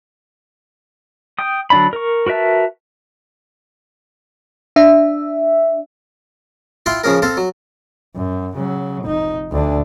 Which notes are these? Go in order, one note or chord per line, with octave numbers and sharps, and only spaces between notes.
G5 D#6
D3 F#3 D4 D5 B5
A#4 C#6
F#4 A#4 B4 E5 A5
D4 E5
E4 F4 F5 G5 B5 C6
C#3 F3 C#4 G#4 A#4
C4 A4 C5 F5
F#3
F#2
C#3 F#3
F1 D#4
D2 D4